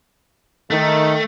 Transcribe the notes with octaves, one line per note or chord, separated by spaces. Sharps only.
D#3 A3